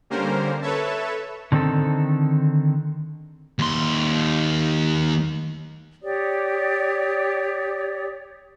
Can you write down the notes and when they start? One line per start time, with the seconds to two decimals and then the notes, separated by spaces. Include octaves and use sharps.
0.10 D3 G3 A#3 C#4 A#4 C5
0.61 A4 B4 C#5 E5 A5
1.52 D3 D#3 C4 D#4 A4
3.59 D#2 C6
6.02 G4 C#5 D5 D#6